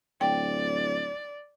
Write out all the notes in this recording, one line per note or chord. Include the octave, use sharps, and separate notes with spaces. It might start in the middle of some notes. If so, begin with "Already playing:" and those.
D1 D5 G5